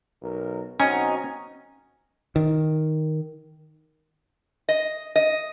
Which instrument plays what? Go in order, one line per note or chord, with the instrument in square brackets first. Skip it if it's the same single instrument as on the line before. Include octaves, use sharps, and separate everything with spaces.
[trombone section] B1 A#4
[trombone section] B1 C4 F#4 [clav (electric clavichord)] C#4 [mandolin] D#4 D#5 [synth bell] G#5
[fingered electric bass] D#3
[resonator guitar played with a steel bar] D#5
D#5